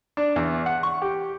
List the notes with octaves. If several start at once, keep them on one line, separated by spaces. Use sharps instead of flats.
D4
E2
F#5
C#6
G4